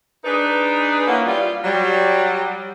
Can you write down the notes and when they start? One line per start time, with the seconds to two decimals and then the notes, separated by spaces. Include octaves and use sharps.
0.24 D4 D#4 G#4 B4
1.07 A#3 C#4 E4 F#5
1.25 G3 F4
1.64 F#3 G3